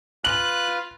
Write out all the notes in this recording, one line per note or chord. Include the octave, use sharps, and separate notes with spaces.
F4 B4 F5 F#6 F#7